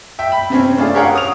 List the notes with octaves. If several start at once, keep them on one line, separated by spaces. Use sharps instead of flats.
E5 G5
B5
C3 C4 C#4
A3 D4 F4 G#4
G4 G#4 A#4 C#5 F5 F#5
D#6 F7